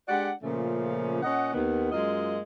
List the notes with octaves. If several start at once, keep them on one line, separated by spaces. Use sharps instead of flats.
G#3 D4 G4 D5 F#5
A#2 C#3 F3 A3 A#3 C#4
A#2 C#4 D#5 F#5
D#2 D#3 B3
F#2 G#3 A#3 F4 D#5